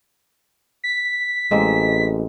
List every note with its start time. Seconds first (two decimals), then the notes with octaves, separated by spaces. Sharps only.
0.84 B6
1.51 A1 G#3 A#3 C4